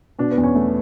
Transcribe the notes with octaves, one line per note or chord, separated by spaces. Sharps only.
B2 D4
B3
E2
C#4
A3